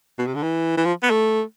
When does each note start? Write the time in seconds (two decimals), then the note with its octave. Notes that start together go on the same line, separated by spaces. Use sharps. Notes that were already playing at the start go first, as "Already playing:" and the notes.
0.18 B2
0.27 C3
0.35 D3
0.43 E3
0.77 E3
0.85 F3
1.03 B3
1.11 A3